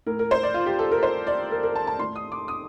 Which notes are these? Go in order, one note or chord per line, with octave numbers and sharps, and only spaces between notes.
A2 A#4
A#4
C5
D5
F4
G4
A4
A#4
C5
D5
A#4
A#4
A5
A5
A2 C6
D#6
D6
D#6